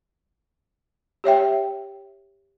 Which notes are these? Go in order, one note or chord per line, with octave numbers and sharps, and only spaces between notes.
G4 C#5 E5 G5